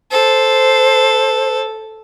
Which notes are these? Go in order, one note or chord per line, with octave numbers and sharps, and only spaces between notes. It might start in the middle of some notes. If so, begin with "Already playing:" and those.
A4 C5